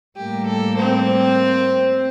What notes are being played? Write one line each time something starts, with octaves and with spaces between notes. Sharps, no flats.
A2 G3 A#3 G4
A4
C4 C5